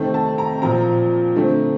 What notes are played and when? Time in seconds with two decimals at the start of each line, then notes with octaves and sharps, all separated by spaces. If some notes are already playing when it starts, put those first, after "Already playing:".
Already playing: C3 D#3 A3 C4
0.14 A5
0.38 A#5
0.62 A#2 F3 C4 A#5
1.35 D3 A3 C4